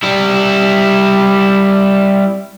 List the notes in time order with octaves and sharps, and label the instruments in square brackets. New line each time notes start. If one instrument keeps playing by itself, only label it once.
[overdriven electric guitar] G3 E4